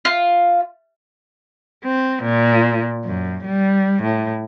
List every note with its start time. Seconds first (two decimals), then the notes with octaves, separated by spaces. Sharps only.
0.05 F4
1.84 C4
2.23 A#2
3.04 F#2
3.45 G3
4.02 A2